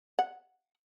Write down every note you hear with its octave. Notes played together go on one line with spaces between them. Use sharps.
F#5